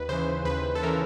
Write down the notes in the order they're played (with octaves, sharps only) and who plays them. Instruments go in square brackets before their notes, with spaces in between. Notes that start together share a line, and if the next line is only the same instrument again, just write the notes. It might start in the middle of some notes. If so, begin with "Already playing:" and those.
Already playing: [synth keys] D#2 B4
C#3 E3 C5
D#2 B4
A4
C#3 E3 A#4